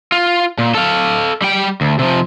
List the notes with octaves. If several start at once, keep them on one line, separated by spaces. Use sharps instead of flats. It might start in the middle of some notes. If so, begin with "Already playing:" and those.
F4
A#2
A4 F5
G3 G5
D2
C3 F3